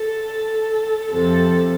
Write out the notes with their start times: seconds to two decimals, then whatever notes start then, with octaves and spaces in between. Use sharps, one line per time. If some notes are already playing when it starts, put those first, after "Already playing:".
Already playing: A4
1.10 F2 C3 F3 A4